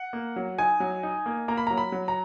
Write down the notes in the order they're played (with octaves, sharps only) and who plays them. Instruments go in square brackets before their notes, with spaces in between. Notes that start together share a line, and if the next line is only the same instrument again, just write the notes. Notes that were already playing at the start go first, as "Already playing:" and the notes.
Already playing: [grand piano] F#5
A#3
F#3
D#4 G#5
F#3
D#4
A#3
A#3 A#5
B5
F#3 A#5
B5
F#3
A#5